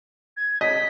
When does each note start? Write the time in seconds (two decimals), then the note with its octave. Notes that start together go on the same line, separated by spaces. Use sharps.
0.37 G#6
0.61 D#5 B6